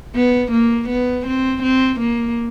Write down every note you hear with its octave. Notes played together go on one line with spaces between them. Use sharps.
B3
A#3
B3
C4
C4
A#3